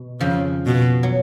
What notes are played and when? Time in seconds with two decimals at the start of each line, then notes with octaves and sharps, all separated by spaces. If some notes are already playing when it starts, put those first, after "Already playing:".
Already playing: B2
0.21 F2 C#3 F3
0.66 B2
1.03 F#3